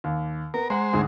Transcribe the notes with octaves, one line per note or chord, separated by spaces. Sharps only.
D#2
B3 A#4
G#3 C5 F#5 A#5
D2 G#2 G#4